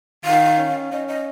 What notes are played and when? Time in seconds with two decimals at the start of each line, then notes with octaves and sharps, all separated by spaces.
0.25 D#3 F5
0.58 C#4
0.92 C#4 D#5
1.08 D#5